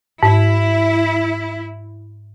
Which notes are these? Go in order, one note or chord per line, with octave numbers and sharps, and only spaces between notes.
G#2 E4